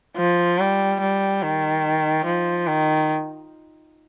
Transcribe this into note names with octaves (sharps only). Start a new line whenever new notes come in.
F3
G3
G3
D#3
F3
D#3